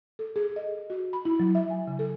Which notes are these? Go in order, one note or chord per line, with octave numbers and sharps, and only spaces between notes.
A4
G#4
D#5
F#4
B5
E4
F#3
E5
G#5
C#3
A4